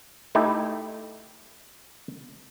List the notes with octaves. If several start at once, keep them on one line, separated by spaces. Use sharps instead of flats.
A3 D#4 E4 G4 A4